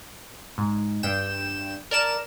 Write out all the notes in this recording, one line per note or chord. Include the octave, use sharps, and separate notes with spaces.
G#2
G2 G5 E7
A#4 D5 A5 E7